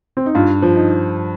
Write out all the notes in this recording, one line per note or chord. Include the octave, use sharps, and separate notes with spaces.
C4
D#4
G2 F4
F3
D#4